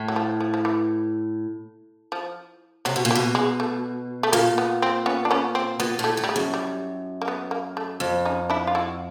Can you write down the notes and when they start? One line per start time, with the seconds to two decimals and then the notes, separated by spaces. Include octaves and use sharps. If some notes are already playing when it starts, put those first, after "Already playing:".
Already playing: A2
0.08 F#3
0.16 F3
0.40 F3
0.54 F3
0.65 E3
2.12 F3
2.85 C3 F#3
2.96 B2
3.05 A#2
3.11 G3
3.15 B2
3.35 G#3
3.60 A3
4.23 A3
4.32 A#2 A#3
4.58 B3
4.82 C4
5.06 B3 C#4
5.25 D4
5.31 B3 C#4
5.55 C4
5.79 A#2 B3
5.99 A2
6.04 A3
6.17 A2
6.24 G3
6.29 G#3
6.36 F#2
6.54 G3
7.21 A#3
7.28 B3
7.51 A#3
7.77 A3
8.00 F2
8.25 C#4 D#4
8.50 D4 E4
8.67 F4
8.75 E4 F#4